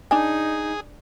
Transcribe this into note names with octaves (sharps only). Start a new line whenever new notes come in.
D4 D#4 G#4 G#5